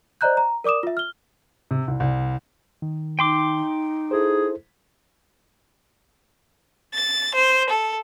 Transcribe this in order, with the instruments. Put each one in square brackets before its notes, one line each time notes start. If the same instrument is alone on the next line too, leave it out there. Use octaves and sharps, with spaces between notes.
[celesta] C5 D5 D#5 A#5 F#6 G6
A#5
A#4 D5 D6 D#6 E7
F4 E5
F6 G7
[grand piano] C3
C2
C2
[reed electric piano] D#3
[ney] D#4 [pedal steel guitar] G5 C6 D6
[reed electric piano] E4 A4 C5 [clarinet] G#4
[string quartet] A6
C5
A4